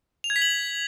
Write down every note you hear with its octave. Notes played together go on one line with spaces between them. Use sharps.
F7
G#6
B6
F#7